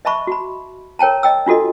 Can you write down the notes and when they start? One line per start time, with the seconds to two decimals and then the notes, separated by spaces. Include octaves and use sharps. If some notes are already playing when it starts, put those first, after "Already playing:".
0.05 D#5 E5 A5 B5 C#6
0.27 F#4 B5
0.99 A#4 C#5 G5 A5 A#5
1.23 D#5 G5 E6
1.46 D4 F4 F#4 A4 D#5